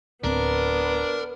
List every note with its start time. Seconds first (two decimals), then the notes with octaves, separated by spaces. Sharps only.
0.24 D1 B3 C4 D4 A#4